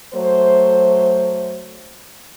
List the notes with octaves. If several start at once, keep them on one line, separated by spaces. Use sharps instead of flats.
F#3 A3 C5